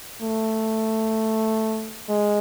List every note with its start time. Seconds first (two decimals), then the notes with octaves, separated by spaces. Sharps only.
0.22 A3
2.09 G#3